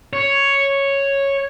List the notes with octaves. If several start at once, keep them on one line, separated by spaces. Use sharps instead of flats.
C#5